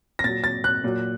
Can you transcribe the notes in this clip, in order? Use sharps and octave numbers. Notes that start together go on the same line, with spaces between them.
A#6
A#2 F#3 A6
A6
F#6
A#2 F#3